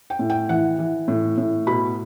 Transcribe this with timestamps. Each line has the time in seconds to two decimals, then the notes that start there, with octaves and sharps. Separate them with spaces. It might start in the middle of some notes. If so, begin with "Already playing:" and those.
0.10 G5
0.19 A2
0.30 G5
0.49 E3 F#5
0.79 E3
1.08 A2
1.38 A2
1.67 B2 B5